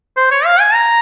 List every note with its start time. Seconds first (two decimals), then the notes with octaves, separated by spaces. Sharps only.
0.17 C5
0.31 C#5
0.46 F5
0.60 G#5
0.74 A#5